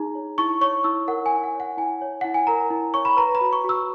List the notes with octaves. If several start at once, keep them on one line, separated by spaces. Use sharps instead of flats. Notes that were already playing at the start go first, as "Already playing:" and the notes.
Already playing: D#4 G#4 A#5
C#5
E4 C#6
C#5 C#6
E4 E6
A#4 F#5
G#5
E4
F#5
C#5
F#5
E4 G#5
C#5
E4 F#5
G#5
A#4 A#5
E4
C#5 C#6
B5
B4 A#5
B5
F#4
C#6
F#4
E6